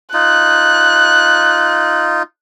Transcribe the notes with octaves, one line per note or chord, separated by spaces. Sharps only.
D#4 F4 F#6